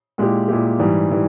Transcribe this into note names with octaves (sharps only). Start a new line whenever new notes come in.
A#2 G#3 E4 G4
A#2 G#3 E4 G4
G#2 E3 G3
E3 G3